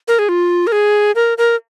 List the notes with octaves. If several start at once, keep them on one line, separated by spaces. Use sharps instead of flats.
A#4
G#4
F4
A#4
G#4
A#4
A#4